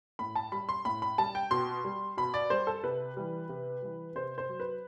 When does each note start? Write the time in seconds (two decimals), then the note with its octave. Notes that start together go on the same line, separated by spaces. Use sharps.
0.19 A2 B5
0.36 A5
0.52 G3 B5
0.69 C6
0.85 A2 B5
1.02 B5
1.18 G3 A5
1.35 G5
1.51 B2 C6
1.84 G3
2.17 B2 B5
2.34 D5
2.50 G3 C5
2.67 A4
2.83 C3 B4
3.17 E3 G3
3.49 C3
3.82 E3 G3
4.15 C3 C5
4.38 C5
4.49 F#3
4.60 B4